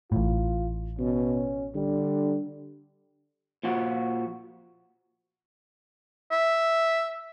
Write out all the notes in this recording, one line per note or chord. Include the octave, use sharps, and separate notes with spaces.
A1 A2 F4
B2 C#4
D3 G3
A#2 F3 F#4
E5